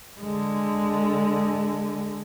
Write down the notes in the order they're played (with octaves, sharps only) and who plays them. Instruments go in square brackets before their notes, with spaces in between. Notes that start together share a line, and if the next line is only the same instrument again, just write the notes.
[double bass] D3 G#3